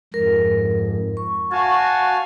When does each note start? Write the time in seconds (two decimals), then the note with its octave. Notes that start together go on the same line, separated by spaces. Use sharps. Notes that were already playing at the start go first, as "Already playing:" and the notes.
0.14 F2 G#2 A#4
1.17 C#6
1.52 F#4 F5 G#5 A5